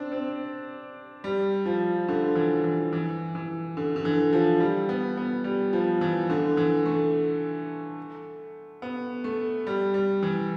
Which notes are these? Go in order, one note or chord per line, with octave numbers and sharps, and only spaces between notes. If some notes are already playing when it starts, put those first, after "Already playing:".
Already playing: C4 D4
C4
G3
F3
D3
E3
E3
E3
E3
D3
D3
E3
F3
G3
B3
B3
G3
F3
E3
D3
E3
A3
B3
A3
G3
G3
E3